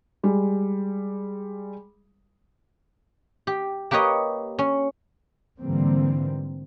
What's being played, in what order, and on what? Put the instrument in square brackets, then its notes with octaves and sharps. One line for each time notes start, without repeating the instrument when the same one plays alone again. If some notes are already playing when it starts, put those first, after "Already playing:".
[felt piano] G3 G#3
[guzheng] G4
A#3 G4 B4 C#5 D#5
C#4
[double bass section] G#2 D3 E3 G3 A#3 C4